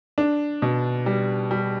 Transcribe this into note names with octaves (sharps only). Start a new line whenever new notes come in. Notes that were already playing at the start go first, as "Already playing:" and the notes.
D4
B2
G3
G3